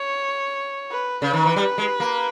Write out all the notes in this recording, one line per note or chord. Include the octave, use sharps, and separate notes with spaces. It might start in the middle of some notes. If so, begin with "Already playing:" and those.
Already playing: C#5
B4
C#3 B4
D#3
E3
G3
G#3
A#3